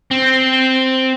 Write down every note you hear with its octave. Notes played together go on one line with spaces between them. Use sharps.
C4